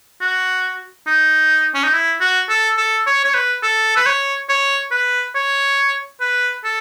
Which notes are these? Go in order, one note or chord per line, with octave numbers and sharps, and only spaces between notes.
F#4
D#4
C#4
D#4
E4
F#4
A4
A4
C#5
C#5
B4
A4
B4
C#5
C#5
B4
C#5
B4
A4